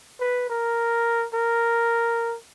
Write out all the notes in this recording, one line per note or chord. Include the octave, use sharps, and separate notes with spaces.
B4
A#4
A#4